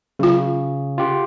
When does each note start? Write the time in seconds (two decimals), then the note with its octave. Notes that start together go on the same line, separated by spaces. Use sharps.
0.19 C#3 F#3 F4
0.98 F4 G4